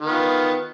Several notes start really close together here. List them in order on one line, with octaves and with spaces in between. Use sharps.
D#3 B3 F4